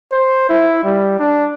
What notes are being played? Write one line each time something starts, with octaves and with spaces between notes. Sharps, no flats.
C5
E4
G3
D4